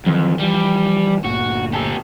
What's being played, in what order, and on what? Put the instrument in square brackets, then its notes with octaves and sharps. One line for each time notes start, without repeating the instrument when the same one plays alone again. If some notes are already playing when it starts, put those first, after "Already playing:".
[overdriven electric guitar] F2 [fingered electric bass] D#3 E3 F#3
[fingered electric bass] E3 F3 [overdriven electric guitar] G3
[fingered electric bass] G1 D2 A#2 [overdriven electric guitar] F#4
[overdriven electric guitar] G4 A4